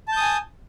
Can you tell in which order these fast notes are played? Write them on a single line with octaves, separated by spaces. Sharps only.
A5 G6 D#6 G#5